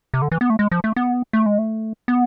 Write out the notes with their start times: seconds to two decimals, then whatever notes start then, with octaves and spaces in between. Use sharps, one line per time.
0.14 C3
0.22 D3
0.32 E3
0.41 B3
0.50 A3
0.59 G#3
0.71 F3
0.84 A3
0.96 B3
1.33 A3
1.46 G#3
1.58 A3
2.08 B3